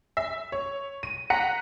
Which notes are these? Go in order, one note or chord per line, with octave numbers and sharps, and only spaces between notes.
E5
C#5
D#7
F#5 A#5 B6 C#7